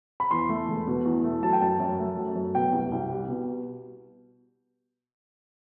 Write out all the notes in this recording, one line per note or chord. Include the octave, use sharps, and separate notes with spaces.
B5
E2 C6
A3
E1
B2
E2
A3
F#3 A5
G5
F#2 A5
F#2
A3
F#3
F#2
B2 G5
C2
C2
G3
B2